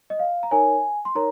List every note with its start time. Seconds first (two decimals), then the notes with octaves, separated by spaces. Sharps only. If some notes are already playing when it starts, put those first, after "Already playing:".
0.10 D#5
0.19 F5
0.43 A#5
0.51 D#4 A#4 C#5 G#5
1.05 C6
1.15 D#4 A#4 C#5 A#5